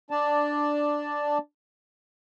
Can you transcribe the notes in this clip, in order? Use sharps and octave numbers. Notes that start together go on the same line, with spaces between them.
D4 D5 A5